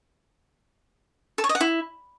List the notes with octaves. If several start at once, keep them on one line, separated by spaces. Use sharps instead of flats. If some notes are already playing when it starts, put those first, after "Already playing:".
A4
C#5
D#5
F#5
E4